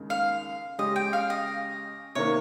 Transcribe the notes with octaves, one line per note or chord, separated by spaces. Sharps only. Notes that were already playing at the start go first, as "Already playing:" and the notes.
Already playing: D#2 C#3 G#3
F5
C#3 G#3 C#4 G4 D#5
G5
F5
D#5
C3 D#3 A#3 C#5